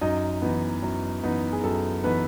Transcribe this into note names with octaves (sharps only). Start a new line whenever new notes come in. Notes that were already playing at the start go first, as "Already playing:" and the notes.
F#2 D#4 D#5
E3 B3 D#4
F#2
E3 B3 D#4
G#4
F#2 A4
E3 B3 D#4 B4